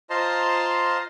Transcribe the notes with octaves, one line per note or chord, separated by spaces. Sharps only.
F4 C5 D#5 A5 A#5 C6